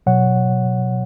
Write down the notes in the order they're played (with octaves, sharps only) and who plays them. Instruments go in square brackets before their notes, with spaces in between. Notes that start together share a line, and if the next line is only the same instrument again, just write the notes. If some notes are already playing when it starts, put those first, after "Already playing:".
[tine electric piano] B2 F#3 C#5 F#5